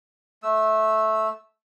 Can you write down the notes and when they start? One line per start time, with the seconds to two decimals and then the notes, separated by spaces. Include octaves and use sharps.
0.43 A3 E6